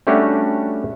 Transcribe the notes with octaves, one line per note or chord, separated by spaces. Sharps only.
G3 A3 C#4 D4 F#4 G4